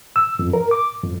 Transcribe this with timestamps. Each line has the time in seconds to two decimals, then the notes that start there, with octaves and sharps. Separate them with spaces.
0.16 E6
0.39 F2
0.53 A#4
0.71 D6
1.04 F2